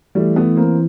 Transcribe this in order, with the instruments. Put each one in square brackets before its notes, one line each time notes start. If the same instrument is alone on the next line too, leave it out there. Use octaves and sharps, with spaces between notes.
[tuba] E3 [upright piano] G3 A3
[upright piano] A3 B3
A#3 C4